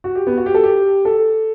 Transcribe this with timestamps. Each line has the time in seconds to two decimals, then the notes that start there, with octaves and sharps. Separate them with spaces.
0.04 F#4
0.15 G4
0.27 B3
0.37 F#4
0.46 G4
0.54 A4
0.63 G4
1.05 A4